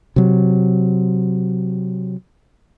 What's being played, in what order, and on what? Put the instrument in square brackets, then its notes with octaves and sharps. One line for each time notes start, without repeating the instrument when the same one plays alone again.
[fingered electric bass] C3 F#3